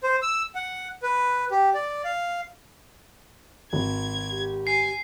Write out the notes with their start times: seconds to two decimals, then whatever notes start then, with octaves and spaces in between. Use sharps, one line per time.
0.03 C5
0.22 E6
0.55 F#5
1.03 B4
1.51 G4
1.74 D5
2.05 F5
3.73 G#1 G#6
4.30 G4
4.67 G#5 C7